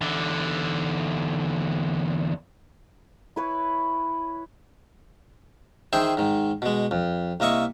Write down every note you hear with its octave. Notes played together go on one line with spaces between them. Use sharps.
E2 D3
E4 B4 C#5
D#3 G#4 C5 E5 G5
G#2 D#3
B2 G#3
F2
C2 A#3 D#5 E5 C#6